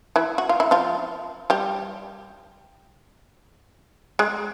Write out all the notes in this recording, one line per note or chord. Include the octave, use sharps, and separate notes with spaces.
E3 E4
F#4
F4
E4
F3 F4
G3 G4
G#3 G#4